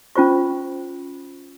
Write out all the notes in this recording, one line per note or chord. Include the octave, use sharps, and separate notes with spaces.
C#4 F4 C5 C#6